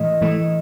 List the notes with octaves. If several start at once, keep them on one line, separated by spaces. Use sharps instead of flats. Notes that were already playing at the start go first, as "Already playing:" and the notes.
Already playing: A2 E3 A3 D#5
A2 E3 A3